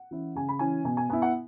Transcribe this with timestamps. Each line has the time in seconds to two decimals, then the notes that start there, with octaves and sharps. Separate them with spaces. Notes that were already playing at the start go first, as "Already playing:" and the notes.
Already playing: F#5
0.11 E3 C#4 E4
0.35 C#3 G#5
0.49 B5
0.59 E3 C#4 E4 G#5
0.85 B2 G#5
0.97 G#5
1.09 B3 E4 G#5
1.22 F#5